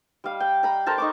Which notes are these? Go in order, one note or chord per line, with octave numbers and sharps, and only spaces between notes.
G3 F5
G5
A#5 B5
A4 A#4 C5 A5
D#4 C#6 D6